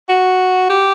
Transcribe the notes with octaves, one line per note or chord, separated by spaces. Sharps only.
F#4
G4